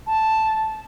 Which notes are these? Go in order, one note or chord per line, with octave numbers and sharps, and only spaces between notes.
A5